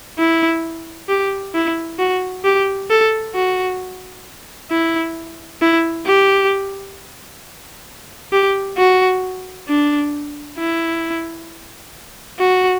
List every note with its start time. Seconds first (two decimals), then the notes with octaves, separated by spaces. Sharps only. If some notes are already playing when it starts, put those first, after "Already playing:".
0.19 E4
1.09 G4
1.55 E4
1.99 F#4
2.44 G4
2.90 A4
3.35 F#4
4.71 E4
5.62 E4
6.06 G4
8.32 G4
8.77 F#4
9.68 D4
10.58 E4
12.39 F#4